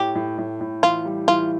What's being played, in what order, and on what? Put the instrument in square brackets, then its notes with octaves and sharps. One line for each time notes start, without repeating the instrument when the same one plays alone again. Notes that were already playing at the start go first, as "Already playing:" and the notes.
Already playing: [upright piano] A2 [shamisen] G4
[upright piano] A2
A2
A2
[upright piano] E3 [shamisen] F4
[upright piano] G3
[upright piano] E3 [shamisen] F4